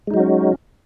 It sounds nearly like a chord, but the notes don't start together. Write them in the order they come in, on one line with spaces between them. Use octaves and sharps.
G#3 D#4 F#3 F#4 C#4